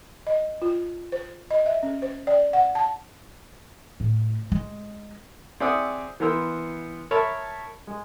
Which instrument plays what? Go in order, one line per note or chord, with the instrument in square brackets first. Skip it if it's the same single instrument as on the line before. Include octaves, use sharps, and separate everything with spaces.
[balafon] D#5
F4
C5
D#5
E5
C#4
C5
D5
F#5
A5
[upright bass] A2
G#3
[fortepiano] C4 G#4 D5 E5 F#5 D#6
E3 B3 A#4 C5 E6
A#4 C#5 E5 A5 B5
G#3